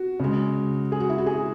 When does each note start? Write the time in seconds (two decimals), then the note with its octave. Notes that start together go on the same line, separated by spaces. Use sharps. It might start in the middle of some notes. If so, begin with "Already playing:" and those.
Already playing: F#4
0.20 C#3 G#3
0.92 G#4
1.00 F#4
1.09 E4
1.18 F#4
1.26 G#4